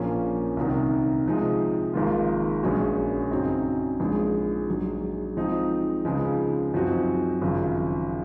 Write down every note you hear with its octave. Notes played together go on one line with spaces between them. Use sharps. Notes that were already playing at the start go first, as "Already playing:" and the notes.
Already playing: A#1 A#2 F3 A#3 C#4
C2 C3 D#3
C3 F3 G#3 D#4
G#1 G#2 F3 A#3 F4
A#1 A#2 G#3 C#4 F#4
F#2 C#3 F#3 C4 D#4
A#1 G#2 F3 G#3
A#1 G#2 F#3
G#2 F3 C4 D#4
C#2 C#3 F3 G#3 D#4
F#2 F3 C4 D#4 F#4
G#1 F#2 C#3 F3